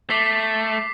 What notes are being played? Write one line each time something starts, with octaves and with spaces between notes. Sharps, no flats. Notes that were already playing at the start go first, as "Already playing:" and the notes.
A3 D6 B6 C7